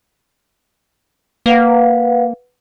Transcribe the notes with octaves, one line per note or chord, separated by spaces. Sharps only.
A#3 B4 F5 F#5